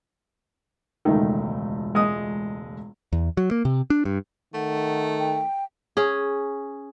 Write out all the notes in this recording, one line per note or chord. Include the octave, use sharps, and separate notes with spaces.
E1 C#2 D#3 A3
G#3 D#6
E2
F#3
A#3
C3
D4
G2
D#3 A3 F#5
G5
C#4 G#4